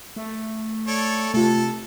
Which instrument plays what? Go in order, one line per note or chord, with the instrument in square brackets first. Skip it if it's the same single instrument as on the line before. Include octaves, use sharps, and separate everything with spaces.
[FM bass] A3
[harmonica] A4 C#5 D5
[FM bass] C3 [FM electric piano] A3 F4 [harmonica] A4